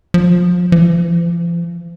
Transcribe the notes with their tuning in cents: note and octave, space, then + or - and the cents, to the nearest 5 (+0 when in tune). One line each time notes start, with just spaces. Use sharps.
F3 +25
F3 -40